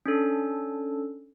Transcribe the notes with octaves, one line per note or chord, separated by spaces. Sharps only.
C#4 D4 A4